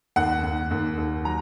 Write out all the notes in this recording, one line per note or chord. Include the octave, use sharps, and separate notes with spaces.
D#2 F#5
D#2
D#2
D#2
F#3 A#5